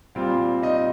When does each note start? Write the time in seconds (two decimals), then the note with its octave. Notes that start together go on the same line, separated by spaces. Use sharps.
0.15 A#2 G3 C4 F4 F5
0.63 D#4 D#5